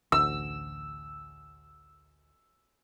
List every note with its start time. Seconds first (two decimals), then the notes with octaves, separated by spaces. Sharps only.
0.12 A1 D2 E6